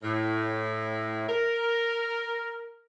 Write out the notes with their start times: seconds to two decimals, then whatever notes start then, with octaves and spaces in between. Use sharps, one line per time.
0.04 A2
1.29 A#4